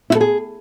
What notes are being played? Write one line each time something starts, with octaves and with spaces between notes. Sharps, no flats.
E4
A4
G#4